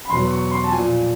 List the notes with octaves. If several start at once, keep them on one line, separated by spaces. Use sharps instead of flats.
B5
E2 B2 F#3 C6
C#6
C6
A5
A#2 F3 G#5